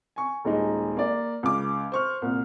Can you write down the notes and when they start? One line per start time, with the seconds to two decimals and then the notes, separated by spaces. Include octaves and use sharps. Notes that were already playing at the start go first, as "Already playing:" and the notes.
0.16 G#5 C#6
0.45 D#1 G#3 D#4
0.97 A#3 D5
1.43 C#2 D6
1.92 C5 C#6 F6
2.22 C2 A#2